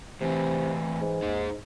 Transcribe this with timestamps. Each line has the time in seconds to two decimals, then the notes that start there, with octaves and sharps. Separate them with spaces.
0.21 A2 C3 E3 C4
1.01 G#2
1.22 D#2 D#4 G#4